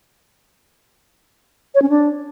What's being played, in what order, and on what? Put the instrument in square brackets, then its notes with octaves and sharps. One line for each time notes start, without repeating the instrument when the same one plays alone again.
[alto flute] C#5
C#4
D4